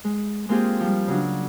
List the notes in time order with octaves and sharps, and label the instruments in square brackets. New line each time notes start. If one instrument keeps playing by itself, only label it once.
[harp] G#3
G#3 A#3 C4 F4 G4 G#4
F3 G3
C#3 F#3 D4